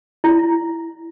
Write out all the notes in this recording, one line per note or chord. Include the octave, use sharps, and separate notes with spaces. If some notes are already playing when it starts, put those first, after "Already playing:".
E4